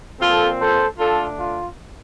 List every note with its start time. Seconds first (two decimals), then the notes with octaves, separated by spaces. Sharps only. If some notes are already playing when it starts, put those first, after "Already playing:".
0.20 A#2 F3 C4 F4 A4
0.59 A4 C5
0.99 D3 A3 D4 F4 A4
1.38 F4